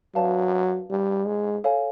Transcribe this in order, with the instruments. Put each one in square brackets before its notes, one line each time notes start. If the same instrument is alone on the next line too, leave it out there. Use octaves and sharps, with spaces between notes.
[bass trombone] F#3 [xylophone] B4 D5 F5 A5
[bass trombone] G3
G#3
[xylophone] A4 C#5 F5 G#5